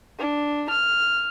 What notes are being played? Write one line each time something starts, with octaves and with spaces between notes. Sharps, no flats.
D4
F6